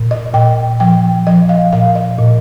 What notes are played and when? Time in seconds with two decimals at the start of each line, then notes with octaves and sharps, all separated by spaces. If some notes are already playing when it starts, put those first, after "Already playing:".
Already playing: A#2
0.11 D#5
0.33 A#2 G5
0.80 F3 G5
1.27 F3 D#5
1.49 F5
1.73 A#2 F5
1.95 D#5
2.18 A#2